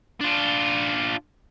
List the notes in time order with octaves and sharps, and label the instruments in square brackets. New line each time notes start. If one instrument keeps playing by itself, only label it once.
[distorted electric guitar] D4 F4